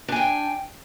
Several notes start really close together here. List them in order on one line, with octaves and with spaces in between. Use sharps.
D4 G#5 G5